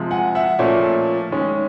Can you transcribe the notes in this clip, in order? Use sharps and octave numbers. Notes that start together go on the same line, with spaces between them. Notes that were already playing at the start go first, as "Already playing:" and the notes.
Already playing: C3 F3 G#3
F#5 G#5
E5 F#5
A#2 F3 A3 C#4 D5 E5
D#3 G#3 C#4